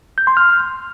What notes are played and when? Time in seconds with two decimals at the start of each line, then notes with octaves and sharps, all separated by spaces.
0.18 G6
0.27 C6
0.37 F6